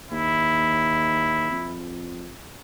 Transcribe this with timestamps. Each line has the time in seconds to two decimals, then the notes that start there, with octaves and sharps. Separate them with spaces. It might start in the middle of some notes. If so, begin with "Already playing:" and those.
0.11 D#2 E4
1.50 F2